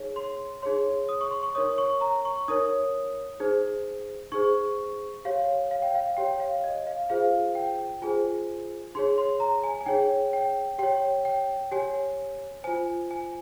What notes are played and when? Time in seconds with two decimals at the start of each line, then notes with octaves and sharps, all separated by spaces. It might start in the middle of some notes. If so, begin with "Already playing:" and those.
Already playing: D#4 G#4 C#5
0.16 C6
0.62 D#4 G#4 C#5 C6
1.09 D#6
1.21 C#6
1.31 C6
1.43 C#6
1.55 D#4 A#4 C#5 D#6
1.78 C#6
2.01 A#5
2.25 C#6
2.48 D#4 A#4 C#5 D#6
3.40 D#4 G#4 C5
4.32 D#4 G#4 C5 C#6
5.25 G4 C#5 F5
5.71 F5
5.82 G5
5.95 F5
6.17 G4 C#5 G5
6.40 F5
6.64 D#5
6.87 F5
7.10 F4 G#4 C5 F5
7.55 G5
8.02 F4 G#4 C5 G#5
8.95 D#4 G#4 C#5 C6
9.18 C6
9.40 A#5
9.64 G#5
9.81 G#5
9.86 D#4 G#4 C#5 G5
10.33 G5
10.78 G4 C#5 G5
11.25 G5
11.71 G4 C#5 G#5
12.64 F4 C5 G#5
13.11 G#5